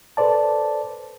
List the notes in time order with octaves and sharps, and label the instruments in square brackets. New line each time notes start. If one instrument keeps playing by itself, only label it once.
[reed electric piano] A4 B4 C5 D5 A5